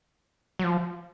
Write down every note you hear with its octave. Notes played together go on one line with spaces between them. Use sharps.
F#3
F3